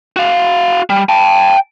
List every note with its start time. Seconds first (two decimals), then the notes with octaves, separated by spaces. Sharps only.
0.16 F#4 F5
0.90 G3
1.09 G5 A5